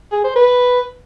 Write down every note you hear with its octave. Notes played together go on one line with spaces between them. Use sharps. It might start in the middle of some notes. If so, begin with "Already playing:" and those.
G#4
C5
B4